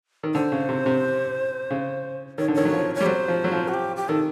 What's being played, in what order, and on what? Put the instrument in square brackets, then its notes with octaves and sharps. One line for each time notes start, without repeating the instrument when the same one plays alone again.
[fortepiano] D#3
[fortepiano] D3 [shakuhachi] C5
[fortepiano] C#3
C3
C3
C#3
[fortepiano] D#3 [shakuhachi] C#5
[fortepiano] D3
[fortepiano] D#3 [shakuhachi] C#5
[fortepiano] F#3
F3
[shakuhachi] C#5
[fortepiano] G3
[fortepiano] F#3 [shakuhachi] C5
[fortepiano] F3
F#3
F3
[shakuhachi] F#4
G4
G4
[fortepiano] D#3 [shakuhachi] A4